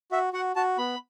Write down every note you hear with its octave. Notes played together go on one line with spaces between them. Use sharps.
F#4 E5
F#4 F#5
F#4 A5
B3 B5